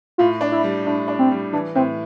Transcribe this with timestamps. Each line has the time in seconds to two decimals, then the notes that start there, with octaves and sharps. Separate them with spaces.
0.18 A2 F4
0.41 D4
0.52 E4
0.63 G3
0.86 A2 D4
1.08 D4
1.19 C4
1.31 G3
1.53 E3 D4
1.75 A2 C4